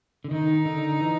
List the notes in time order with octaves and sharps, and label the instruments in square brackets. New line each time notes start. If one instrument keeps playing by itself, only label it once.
[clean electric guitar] D3
[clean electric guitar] D#3 [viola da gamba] D#4
[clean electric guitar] D3
E3